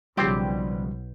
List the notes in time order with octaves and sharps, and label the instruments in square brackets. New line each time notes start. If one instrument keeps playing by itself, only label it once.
[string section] B1 [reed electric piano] C#3 F3 G3 [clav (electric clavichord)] C4 C5 D5 [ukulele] G4